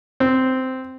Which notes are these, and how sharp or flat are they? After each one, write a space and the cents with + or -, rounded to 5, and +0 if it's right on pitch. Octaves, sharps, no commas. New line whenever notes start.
C4 -10